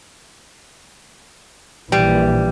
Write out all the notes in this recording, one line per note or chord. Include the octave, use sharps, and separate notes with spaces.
A#1 E3 G3